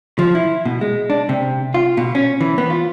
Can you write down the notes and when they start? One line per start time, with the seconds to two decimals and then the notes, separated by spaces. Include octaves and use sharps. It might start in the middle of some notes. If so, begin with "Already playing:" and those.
0.19 F3
0.35 E4
0.66 B2
0.81 G#3
1.10 D4
1.29 C3
1.74 F4
1.97 B2
2.15 C#4
2.41 E3
2.58 B3
2.70 F4